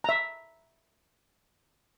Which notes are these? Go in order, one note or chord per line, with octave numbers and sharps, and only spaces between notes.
E5 A#5